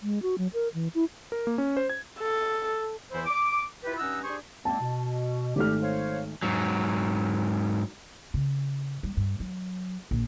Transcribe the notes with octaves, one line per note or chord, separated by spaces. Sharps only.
G#3
F#4
F#3
A#4
E3
E4
A#4
A#3
C#4
C5
G#6
A4
E2 E3 E4 C5
D6
E4 F4 G4 B4
G2 C#4 D#4 F#5 E6
D4 G4 G#4 C5 C#6
G#3 A#3 C4 A5
B2
G#1 A3 G4 F6
C5 C#5 F5
G#2 F#3
C#3
G3
G2
F#3
A#1